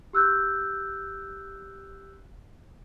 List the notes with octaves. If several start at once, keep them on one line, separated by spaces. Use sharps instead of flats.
G4 E6 F#6 G6